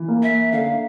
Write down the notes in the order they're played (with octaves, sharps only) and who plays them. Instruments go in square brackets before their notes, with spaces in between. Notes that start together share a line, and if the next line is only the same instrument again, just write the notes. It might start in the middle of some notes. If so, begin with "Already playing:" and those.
Already playing: [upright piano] E3
A#3
[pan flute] E5
[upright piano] D3 [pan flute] F5